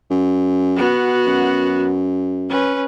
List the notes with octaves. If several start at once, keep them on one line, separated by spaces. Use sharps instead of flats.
F#2
B3 F#4
F#2
C#4 B4